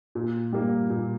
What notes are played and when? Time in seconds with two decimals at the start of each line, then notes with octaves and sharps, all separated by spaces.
0.15 A#2
0.52 G3 A#3
0.90 A#2